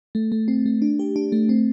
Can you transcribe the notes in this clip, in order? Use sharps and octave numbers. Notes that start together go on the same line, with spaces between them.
A3
A3
C4
A3
D4
G4
D4
A3
C4